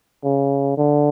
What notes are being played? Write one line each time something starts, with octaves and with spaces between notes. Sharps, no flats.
C#3
D3